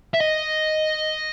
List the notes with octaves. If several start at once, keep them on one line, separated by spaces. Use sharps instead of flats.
E5
D#5